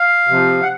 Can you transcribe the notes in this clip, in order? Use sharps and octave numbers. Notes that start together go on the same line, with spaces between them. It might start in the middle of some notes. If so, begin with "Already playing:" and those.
Already playing: F5
C3 F3
F#5